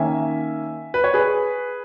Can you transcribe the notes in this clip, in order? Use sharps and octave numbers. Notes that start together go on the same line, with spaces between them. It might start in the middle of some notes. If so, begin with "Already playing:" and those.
Already playing: D#3 A#3 C#4 E5 G#5
B4
C#5
G#4 B4